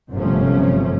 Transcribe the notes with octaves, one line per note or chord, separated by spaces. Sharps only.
G1 F#2 C3 F3 A3 C#4